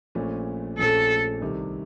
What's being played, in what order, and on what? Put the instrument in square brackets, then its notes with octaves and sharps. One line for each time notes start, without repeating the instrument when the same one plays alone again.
[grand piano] A#1 A#2 A3 C#4
[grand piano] A#1 A#2 A3 C#4 [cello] A4
[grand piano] C2 C3 D#3